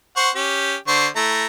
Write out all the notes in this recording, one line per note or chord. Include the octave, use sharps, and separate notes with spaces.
C5 F#5 C#6
C#4 G4
D3 C5 C#6
A3 E4 A#5